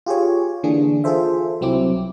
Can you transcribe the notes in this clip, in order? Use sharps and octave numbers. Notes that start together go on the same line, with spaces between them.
F4 G4 G#4 C#5
D3 E3 A#3 D4 G#4
F4 G#4 A4 C5 E5
C2 F#3 C4 E4 D6